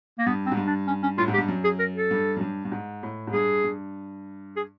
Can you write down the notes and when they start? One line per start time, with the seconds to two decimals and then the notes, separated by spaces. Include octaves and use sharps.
0.19 A#3
0.26 G2 B3
0.46 C4
0.52 G#2
0.57 G2
0.67 D4
0.87 C#4
1.03 C#4
1.18 A2 F4
1.28 G#2
1.33 G4
1.38 G2
1.48 F#2
1.64 G#4
1.79 A#4
1.95 A4
2.11 G2
2.36 F#2
2.41 G2
2.65 G2
2.72 G#2
3.03 A2
3.27 G#2
3.33 G2 G#4
3.64 G2
4.56 G#4